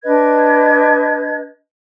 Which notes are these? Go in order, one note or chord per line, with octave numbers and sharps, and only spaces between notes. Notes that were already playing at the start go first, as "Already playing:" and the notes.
D4 B4 D#5 G#6